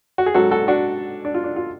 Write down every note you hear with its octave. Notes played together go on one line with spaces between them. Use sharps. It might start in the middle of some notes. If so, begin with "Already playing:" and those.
F#4
G#4
G#2 F#3 C#4 F#4 A4
F#4 A4
D4 F#4
D4
F4
D4
F4